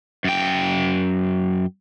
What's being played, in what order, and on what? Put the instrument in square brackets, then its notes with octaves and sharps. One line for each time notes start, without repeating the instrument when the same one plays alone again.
[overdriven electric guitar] F#2 G5